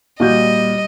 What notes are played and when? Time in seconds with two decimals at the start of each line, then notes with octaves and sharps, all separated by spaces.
0.20 A#2 G3 F#4 D#5 G6